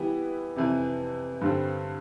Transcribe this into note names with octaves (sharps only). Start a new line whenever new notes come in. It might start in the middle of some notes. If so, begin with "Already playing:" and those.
Already playing: E3 G3 B3 E4 G4
F2 C3 E3
G2 D3 G3 C4